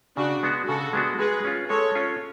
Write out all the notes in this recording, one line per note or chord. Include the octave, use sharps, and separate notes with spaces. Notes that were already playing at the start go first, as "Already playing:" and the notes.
C#3 D4 F#4
G#3 B3 D4 F#4
C#3 F#4 A4
G#3 B3 D4 F#4
G#3 G#4 B4
C#4 F4
G#3 A4 C#5
C#4 F4